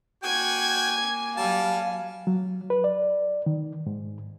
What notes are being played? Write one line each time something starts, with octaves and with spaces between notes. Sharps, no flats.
A#3 F#4 G5 G#5 G#6
F#3 G3 F5 A5
F#3
B4
D5
D#3
G#2